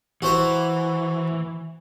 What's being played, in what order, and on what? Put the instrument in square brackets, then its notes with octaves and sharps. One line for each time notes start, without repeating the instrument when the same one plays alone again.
[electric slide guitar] E3 [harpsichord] F#4 C5 A#5